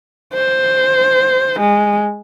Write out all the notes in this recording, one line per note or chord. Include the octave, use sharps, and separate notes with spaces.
C5
G#3